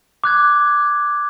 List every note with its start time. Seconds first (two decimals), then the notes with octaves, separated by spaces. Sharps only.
0.24 D6 F#6 G#6